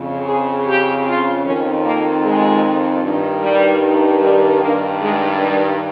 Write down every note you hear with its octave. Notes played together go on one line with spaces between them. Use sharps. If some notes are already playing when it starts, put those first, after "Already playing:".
Already playing: F2 C#3
G#4
G4
F4
F2 D#3 C#4
A#3
G#3
G2 D#3
G3
G3
G2 D#3 A#3
G#3
G3